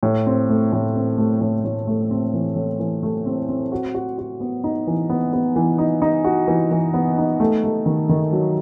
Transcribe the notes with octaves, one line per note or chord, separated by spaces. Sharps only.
A2
C4
A3
A2
C4
A3
A2
A2
A3
C4
E3
A2
E3
A3
C4
C4
F#4
F#4
F#4
B3
D#4
E3
B3
B3
E3
D#4
D#4
F#4
E3
E3
B3
D#4
A3
A3
D#3
D#3
F#3